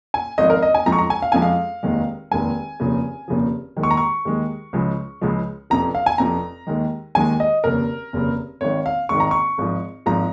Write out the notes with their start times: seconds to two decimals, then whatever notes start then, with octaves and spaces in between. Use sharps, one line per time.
0.14 G#5
0.38 G#1 G#2 F3 D#5
0.50 A#4
0.62 D#5
0.74 G#5
0.86 F2 F3 G#3 A#5
0.92 C#6
0.98 A#5
1.10 G#5
1.22 F5
1.32 F2 F3 G#3 G#5
1.42 F5
1.83 F1 D#2 D#3 G#3
2.31 F1 D#2 D#3 G#3 G#5
2.80 F1 D#2 C#3 F3
3.28 F1 D#2 C#3 F3
3.76 D#2 D#3 G#3
3.83 C#6
3.91 A#5
3.97 C#6
4.25 D#2 D#3 G#3
4.73 C#2 C#3 F3 G#3
5.21 C#2 C#3 F3 G#3
5.70 F1 F2 F3 A#5
5.95 F5
6.06 G#5
6.18 F1 F2 F3 A#5
6.67 D#2 D#3 G#3
7.15 D#2 D#3 G#3 G#5
7.40 D#5
7.64 F1 D#2 C#3 A#4
8.13 F1 D#2 C#3
8.61 G#1 G#2 D#3 C#5
8.86 F5
9.09 G#1 G#2 D#3 C#6
9.20 A#5
9.31 C#6
9.58 G#1 G#2 F3
10.06 G#1 G#2 F3 A#5